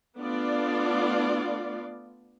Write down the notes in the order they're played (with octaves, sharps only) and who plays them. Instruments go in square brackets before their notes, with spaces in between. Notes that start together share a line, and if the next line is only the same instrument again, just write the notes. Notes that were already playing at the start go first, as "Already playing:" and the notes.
[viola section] A3 B3 D4 F4 D5